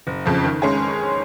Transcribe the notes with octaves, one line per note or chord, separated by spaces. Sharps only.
F#1
F2 C#3 F3
D#3
G#3 C#4 G#4